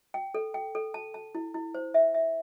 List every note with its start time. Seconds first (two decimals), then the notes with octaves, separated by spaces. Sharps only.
0.14 G5
0.34 A4
0.54 G5
0.75 A4
0.94 A5
1.14 A5
1.35 E4
1.54 E4
1.74 C5
1.94 E5
2.14 E5